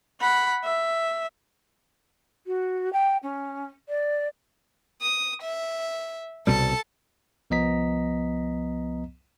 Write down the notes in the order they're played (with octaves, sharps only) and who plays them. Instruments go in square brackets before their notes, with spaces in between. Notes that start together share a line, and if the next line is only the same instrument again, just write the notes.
[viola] F#5 B5
E5
[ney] F#4
G5
C#4
D5
[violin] D#6
E5
[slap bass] C2 B2 G3 [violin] A4 A5
[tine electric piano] C2 F3 B3 D#5 A#5 B6